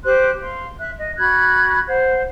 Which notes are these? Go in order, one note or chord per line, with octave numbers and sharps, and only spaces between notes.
G4 C5 C6 F#6
F5 C6
E5 F#6
D#5
F#4 B5 F#6 G#6
C5 F#5